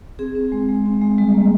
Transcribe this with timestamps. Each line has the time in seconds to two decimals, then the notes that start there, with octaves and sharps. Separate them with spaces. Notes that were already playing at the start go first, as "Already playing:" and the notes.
0.19 C4 G#4
0.35 C4
0.52 G#3
0.69 G#3
0.86 C4
1.01 G#3
1.18 G3
1.34 A#3